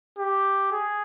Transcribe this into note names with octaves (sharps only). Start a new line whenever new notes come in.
G4
G#4